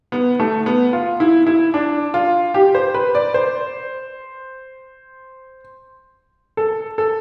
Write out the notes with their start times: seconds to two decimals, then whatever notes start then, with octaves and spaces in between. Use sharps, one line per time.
0.12 B3
0.40 A3
0.66 B3
0.93 F4
1.20 E4
1.47 E4
1.74 D4
2.14 F4
2.54 G4
2.75 C5
2.94 B4
3.15 D5
3.34 C5
6.57 A4
6.98 A4